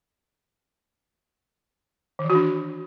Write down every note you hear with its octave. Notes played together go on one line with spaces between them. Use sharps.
D#3
E3
F#4
D4